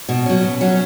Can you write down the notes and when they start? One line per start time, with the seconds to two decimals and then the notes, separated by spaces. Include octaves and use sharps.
0.09 B2
0.26 F#3 C#4
0.43 B2
0.61 F#3 C#4